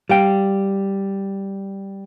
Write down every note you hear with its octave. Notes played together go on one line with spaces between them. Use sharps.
G3 F5 G5